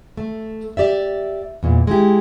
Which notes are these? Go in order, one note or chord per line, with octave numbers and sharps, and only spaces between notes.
A3
G4 D5 E5
E2 A#2
G#3 E4 G4